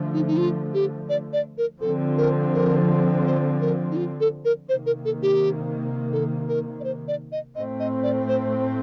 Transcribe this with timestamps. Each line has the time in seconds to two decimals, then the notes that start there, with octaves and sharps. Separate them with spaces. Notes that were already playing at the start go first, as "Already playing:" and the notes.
Already playing: D3 F3 A3
0.14 D#4
0.28 D#4
0.37 F4
0.74 G4
1.09 D5
1.33 D5
1.58 A#4
1.81 D3 F3 C4 A4
2.18 A#4
2.54 A#4
3.26 C5
3.61 A#4
3.91 D#4
3.96 F4
4.20 A4
4.45 A#4
4.69 C3 D#3 A#3 C5
4.86 A#4
5.05 A4
5.22 G4
6.13 A4
6.48 A#4
6.80 D5
6.84 C5
7.08 D5
7.32 D#5
7.55 A2 A3 C4 D#5
7.80 D#5
8.03 D5
8.28 C5